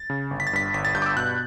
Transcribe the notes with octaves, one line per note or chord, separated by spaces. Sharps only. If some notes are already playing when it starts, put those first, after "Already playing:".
Already playing: A6
C#3
G1
B6
A6
G2 B6
G1 B6
A6
G2 G6
D6
E6
B2 F#6